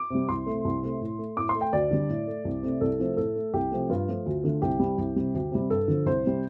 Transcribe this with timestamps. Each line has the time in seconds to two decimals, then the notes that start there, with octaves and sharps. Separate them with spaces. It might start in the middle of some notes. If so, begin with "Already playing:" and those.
Already playing: D6
0.10 C3 G3
0.29 C2 C6
0.46 C3 A3
0.65 C2
0.83 C3 A3
1.01 A2
1.19 A3
1.37 A2 D6
1.49 C6
1.55 A3
1.61 G5
1.73 D2 D5
1.91 D3 G3
2.09 A2
2.27 A3
2.45 C2
2.63 C3 A3
2.81 C2 A4
2.99 C3 F3 A3
3.17 A2 A4
3.36 A3
3.53 C2 G4
3.71 C3 F3 A3
3.90 G2 F4
4.08 F3 A3
4.26 D2
4.43 D3 A3
4.62 C2 G4
4.80 C3 G3
4.98 C2
5.16 C3 G3
5.34 D2
5.52 C3 G3
5.70 G2 A4
5.88 D3 F3
6.06 C2 C5
6.24 C3 G3